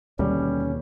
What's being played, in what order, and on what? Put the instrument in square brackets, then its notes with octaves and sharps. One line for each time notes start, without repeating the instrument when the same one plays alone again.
[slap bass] D#2 B2 D3 [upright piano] G3 [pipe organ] C#4